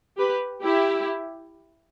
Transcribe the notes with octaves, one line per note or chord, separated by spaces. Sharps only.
G4 B4
E4 G4